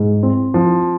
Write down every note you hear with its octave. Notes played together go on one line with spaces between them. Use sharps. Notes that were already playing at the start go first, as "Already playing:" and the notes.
Already playing: G#2
C4
F3